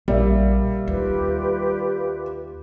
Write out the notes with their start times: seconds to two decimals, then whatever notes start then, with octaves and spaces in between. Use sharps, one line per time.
0.08 A#1 G3 A#3 D5 E5
0.88 D#2 F4 G4 B4